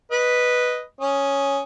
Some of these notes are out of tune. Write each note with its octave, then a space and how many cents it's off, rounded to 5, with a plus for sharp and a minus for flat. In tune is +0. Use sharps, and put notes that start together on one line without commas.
B4 +0 D#5 +0
C#4 +0 D#6 +0